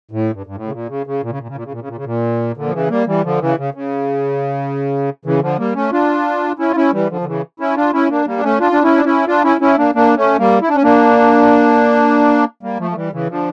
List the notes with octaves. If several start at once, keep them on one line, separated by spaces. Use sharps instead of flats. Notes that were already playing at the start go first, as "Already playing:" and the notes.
A2
G2
G2
A2
C#3
A#2
C#3
C#3
A#2
C#3
A#2
C#3
A#2
C#3
A#2
C#3
A#2
C#3
A#2
A#2 D3
F3
C#3 E3
G3 A#3
E3 G3
D3 F3
C#3 E3
C#3
C#3
C#3 E3
D3 F3
G3 A#3
A3 C#4
D4 F4
C#4 E4
F4
C#4 E4
E3 G3
D3 F3
D3
C#3 E3
C#4 E4
D4 F4
C#4 E4
A#3 D4
G3 A#3
D4
A3 C#4
D4 F4
D4
C#4 E4
D4
C#4 E4
D4 F4
C#4 E4
C#4 E4
A#3 D4
A#3 D4
A3 C#4
G3 A#3
E4
D4
C#4
A#3 D4
G3 A#3
F3 A3
A3
E3 G3
C#3 E3
D3 F3